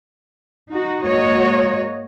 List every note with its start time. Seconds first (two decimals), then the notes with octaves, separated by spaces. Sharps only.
0.72 D#4 F#4
1.04 G#2 A#3 F#4 C#5 D#5